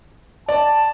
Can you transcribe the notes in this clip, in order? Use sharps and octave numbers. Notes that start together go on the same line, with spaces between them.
D5 A5